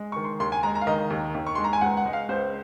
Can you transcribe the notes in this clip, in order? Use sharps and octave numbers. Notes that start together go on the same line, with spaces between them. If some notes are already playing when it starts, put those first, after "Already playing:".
Already playing: G#3
D#3 C#6
C6
D#2 C6
G#5
G#3 A#5
A#5
F5
D#3 D#5
D#2
D#2
C#6
G#3 C6
A#5
G#5
C#2 F#5
F#5
G#3
F5
C#2 C5